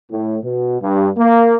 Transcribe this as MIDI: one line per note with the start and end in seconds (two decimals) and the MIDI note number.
0.11 0.38 45
0.43 0.78 47
0.82 1.09 43
1.17 1.55 58